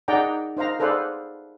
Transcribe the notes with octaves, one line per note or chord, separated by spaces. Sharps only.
D#4 G#4 D5 F#5 G5 A#5
D#4 C5 F5 A#5
G#4 A4 B4 C5 D5 F5